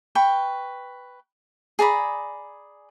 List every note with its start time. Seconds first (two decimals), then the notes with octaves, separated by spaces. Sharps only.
0.15 B4 G5 C#6
1.79 G#4 D5 A#5 B5